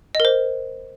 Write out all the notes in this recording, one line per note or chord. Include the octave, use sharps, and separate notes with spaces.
D#5
A#4
C5